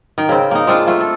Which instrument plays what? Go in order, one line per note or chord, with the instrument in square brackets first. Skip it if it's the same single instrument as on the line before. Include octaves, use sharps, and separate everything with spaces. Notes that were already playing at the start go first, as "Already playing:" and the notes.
[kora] D#3 G5
C#3 C4
A#3 D#4
G#3 C4 D4 F4
A3 F4 C5
A4